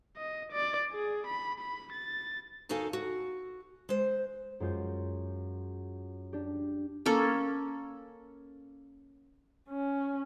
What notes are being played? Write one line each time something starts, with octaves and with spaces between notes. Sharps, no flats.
D#5
D5
G#4
B5
B5
A6
D#2 D#4 F#4 A4 F5 G#5
F#4
G#3 C5
F#2 G#3 F4 G6
D4 G4
A#3 C#4 A4
C#4